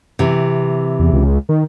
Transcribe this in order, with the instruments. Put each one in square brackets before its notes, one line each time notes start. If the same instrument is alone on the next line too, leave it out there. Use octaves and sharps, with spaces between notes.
[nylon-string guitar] C3 E3
[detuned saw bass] E2
C#2
D#3